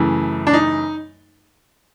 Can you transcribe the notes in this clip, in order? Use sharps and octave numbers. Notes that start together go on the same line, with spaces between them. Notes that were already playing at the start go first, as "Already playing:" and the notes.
Already playing: F#2 C#3 E3 A3
D4
D#4